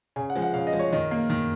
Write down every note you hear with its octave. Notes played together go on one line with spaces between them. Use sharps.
C#3 G#5
F#5
F3 G#3
F#5
C#3 F5
D#5
F3 G#3
C#5
D#3 D#5
A#3
D#3